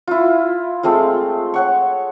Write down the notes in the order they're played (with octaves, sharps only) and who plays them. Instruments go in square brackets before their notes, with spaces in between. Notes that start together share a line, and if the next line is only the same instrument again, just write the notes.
[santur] E4 F4
G#3 A3 C4 F4
C#5 F#5 C#6